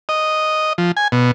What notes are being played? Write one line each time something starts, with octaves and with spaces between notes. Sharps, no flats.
D#5
F3
G#5
B2